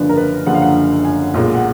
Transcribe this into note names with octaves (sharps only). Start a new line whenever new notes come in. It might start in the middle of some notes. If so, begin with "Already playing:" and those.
Already playing: F#1 F#2 D3 F3 B4 D5
A#4
B4
F#1 F#2 D3 F3 F#5
F5
F#5
G#5
B1 A#2 G#3
F#5